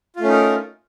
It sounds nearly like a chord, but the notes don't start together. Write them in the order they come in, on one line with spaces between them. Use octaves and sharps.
F4 A3 C#4 D#4 A#4